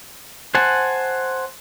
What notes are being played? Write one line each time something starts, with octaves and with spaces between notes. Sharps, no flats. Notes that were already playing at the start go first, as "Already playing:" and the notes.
C5 F#5 G#5 A5